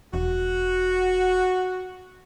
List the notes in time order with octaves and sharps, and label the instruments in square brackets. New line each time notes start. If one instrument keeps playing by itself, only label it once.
[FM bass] E1 [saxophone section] F#4